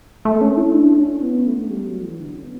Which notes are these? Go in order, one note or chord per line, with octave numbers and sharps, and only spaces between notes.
A3
C#4
E4
D4
C#4
B3
A3
G3
F#3
E3
D3
C#4
B3